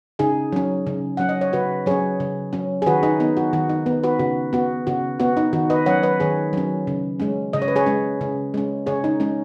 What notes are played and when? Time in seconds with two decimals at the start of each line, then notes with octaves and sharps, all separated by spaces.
0.19 C#3 D#4 G#4
0.52 F#3 C#4
0.87 C#3
1.17 F#3 C#4 F#5
1.29 D#5
1.41 C#5
1.53 C#3 F#4 B4
1.86 F#3 C#4 G#4 C#5
2.20 C#3
2.53 F#3 C#4
2.82 G#4
2.86 D#3 F#4 B4
3.03 D#4 G#4
3.20 B3 D#4
3.37 F#4
3.53 D#3 F#4
3.69 D#4
3.86 B3
4.03 F#4 B4
4.19 C#3 F#4
4.53 B3 F#4
4.87 C#3 F#4
5.20 B3 F#4
5.37 D#4
5.53 D#3 F#4
5.70 B4 D#5
5.86 F#3 C#4 C#5 F#5
6.03 B4 D#5
6.20 D#3 G#4 C#5
6.53 F#3 C#4
6.87 C#3
7.20 G#3 C#4
7.53 C#3 D#5
7.62 C#5
7.68 B4
7.76 G#4 C#5
7.86 G#3 C#4
8.21 C#3
8.54 G#3 C#4
8.86 C#3 G#4 C#5
9.04 D#4
9.20 G#3 C#4